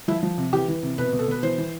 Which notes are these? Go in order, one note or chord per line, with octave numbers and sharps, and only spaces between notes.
F3 E4
F3
C3
E3 G4
E3
C3
B2 B4
B2
A4
B2 B4
E3 C5
E3